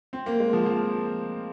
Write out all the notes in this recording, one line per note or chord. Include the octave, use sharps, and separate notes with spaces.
C4
A#3
G#3
F3
F3